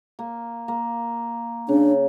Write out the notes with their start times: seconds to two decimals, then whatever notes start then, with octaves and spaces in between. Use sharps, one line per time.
0.19 A#3
0.68 A#3
1.69 C#3 D4